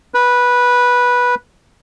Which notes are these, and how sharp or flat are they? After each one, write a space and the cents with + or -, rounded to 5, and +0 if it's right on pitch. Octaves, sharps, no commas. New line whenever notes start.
B4 -10